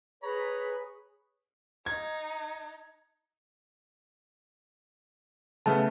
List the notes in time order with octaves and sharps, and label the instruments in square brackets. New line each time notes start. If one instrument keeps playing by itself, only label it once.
[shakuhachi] G#4 [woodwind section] B4 [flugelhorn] C#5 [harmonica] A#5 B5
[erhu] D#4 [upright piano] G#6
[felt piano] C#3 A3 B3 [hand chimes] A5